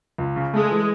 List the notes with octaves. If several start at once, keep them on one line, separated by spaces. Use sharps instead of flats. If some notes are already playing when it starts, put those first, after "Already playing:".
C#2
C#3
G#3 A3
E3